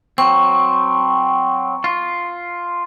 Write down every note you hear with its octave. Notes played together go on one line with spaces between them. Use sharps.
F#3 C4 C#6
F4